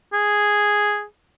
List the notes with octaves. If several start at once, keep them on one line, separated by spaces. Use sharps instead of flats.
G#4